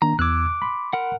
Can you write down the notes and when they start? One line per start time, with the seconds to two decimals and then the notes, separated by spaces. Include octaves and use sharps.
0.02 D#3 A#3 D4 A#5
0.19 E2 D6 E6 F#6 G#6
0.62 B5 C6
0.93 A#4 F#5